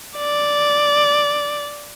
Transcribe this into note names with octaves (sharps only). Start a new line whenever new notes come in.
D5